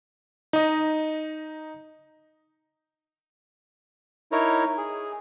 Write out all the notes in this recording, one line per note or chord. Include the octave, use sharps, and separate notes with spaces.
D#4 D#5
D#4 E4 A#4 C#5
G#4